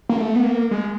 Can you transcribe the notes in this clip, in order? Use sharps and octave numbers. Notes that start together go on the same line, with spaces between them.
A#3
A3
B3
A#3
G#3